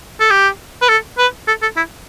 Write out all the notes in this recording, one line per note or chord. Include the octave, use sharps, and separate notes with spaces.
A4
G4
B4
A4
B4
A4
A4
E4